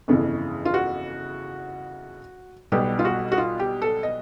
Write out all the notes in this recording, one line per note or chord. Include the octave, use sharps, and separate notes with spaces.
G1 F2 C#3 E3
F4
F#4
B1 B2 G3 B3 G4
F4
F#4
F#4
F4
G4
A4
D#5